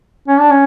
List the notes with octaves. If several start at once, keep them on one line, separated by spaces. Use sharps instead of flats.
C#4
D4
C#4